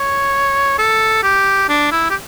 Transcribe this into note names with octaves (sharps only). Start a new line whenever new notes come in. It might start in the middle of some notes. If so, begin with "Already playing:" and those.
Already playing: C#5
A4
G4
D4
E4
G4